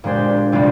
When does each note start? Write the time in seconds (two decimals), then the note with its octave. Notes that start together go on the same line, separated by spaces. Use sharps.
0.04 A#2 G#3 D4 G4 C5
0.52 C3 G3 D4 F4